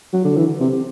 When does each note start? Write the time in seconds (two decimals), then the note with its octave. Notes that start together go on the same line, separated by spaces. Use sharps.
0.13 F#3
0.24 D3
0.37 E3
0.60 C3